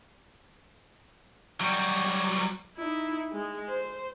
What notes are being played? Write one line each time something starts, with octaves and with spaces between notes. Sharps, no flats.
F#3 G3
D#4 E4
G#3
C5